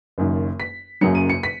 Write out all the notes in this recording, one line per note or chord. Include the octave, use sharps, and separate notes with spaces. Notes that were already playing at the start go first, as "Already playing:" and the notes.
F#1 F#2 D#3
B6
F#1 F#2 C#3 F#3 C#7
D#7
C#7
B6